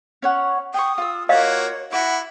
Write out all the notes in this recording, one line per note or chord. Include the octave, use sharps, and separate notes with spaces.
C#4 C#5 F#5
G5 C#6 D#6
F4 E6
A#3 F#4 C#5 D#5 F5
E4 F#5 D6